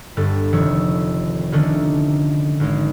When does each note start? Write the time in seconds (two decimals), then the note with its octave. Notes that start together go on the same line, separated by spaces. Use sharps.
0.17 G1 G2 A4
0.52 F1 D#3 F3 C#5 E6
1.52 D3 D#3 A3 A#3 C#4 D4
2.60 G#1 G#3